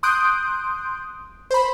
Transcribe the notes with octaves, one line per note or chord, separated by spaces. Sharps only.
C6 D#6 F#6 G6 D7
C5 B5